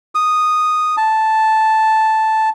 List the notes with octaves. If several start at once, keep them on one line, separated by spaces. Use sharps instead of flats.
D#6
A5